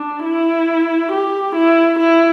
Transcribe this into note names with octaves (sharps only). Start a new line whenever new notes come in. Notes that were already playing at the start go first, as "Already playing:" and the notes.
Already playing: D4
E4
G4
E4
E4